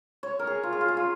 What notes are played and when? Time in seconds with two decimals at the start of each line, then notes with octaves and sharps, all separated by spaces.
0.23 C#5
0.39 A#4
0.47 G#4
0.63 F4
0.72 G#4
0.81 F4
0.88 G#4
0.97 F4